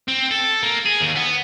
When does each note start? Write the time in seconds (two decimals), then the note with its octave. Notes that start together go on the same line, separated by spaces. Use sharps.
0.08 C4
0.31 A4
0.63 A#3
0.85 G#4
1.01 D#2
1.15 B3